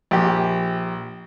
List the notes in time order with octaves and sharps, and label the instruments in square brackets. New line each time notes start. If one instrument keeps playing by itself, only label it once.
[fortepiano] A#1 G4